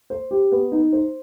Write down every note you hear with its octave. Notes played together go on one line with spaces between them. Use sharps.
C5
G4
B3
D#4
C5